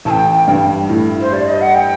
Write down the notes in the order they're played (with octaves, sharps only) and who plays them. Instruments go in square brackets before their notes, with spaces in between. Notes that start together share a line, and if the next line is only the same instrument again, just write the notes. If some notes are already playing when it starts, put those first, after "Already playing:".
[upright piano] A1 [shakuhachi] A5
[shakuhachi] G5
[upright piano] G2
A2
[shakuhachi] C5
[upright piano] G3 [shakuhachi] D5
[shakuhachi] D#5
F#5
G5